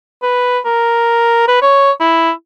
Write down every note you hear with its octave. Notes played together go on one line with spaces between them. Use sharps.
B4
A#4
B4
C#5
E4